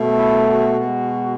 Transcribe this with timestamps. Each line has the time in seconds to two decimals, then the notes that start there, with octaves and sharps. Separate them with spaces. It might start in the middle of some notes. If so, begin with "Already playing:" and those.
Already playing: B2 A3
0.19 E4
0.48 F#4
0.78 B2 G#3